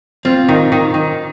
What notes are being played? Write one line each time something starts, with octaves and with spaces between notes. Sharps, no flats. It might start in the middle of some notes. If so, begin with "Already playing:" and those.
C4 F4
D#3
D#3
D#3